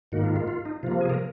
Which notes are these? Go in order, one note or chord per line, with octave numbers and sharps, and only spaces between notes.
G#2 D#3 A#3 F#4
F4
F4
F4
D#4
C3 F3 A#3 F4
G#4
A#4